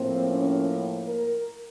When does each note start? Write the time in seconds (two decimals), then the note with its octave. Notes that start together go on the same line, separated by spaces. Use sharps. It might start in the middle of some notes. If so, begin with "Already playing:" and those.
Already playing: A2 F3 A#3 C4
0.31 C#4
1.08 A#4